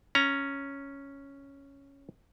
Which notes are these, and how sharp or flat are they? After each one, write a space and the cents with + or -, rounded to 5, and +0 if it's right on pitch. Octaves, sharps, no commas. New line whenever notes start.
C#4 +0 A#5 +0